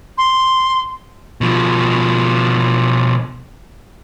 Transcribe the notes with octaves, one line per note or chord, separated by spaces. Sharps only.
C6
B2 F3